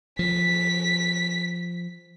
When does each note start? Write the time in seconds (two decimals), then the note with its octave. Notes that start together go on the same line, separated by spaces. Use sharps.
0.19 F3 B6